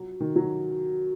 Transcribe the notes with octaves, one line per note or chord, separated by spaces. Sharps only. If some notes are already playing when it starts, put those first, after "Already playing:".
Already playing: F#3
D#3
F#3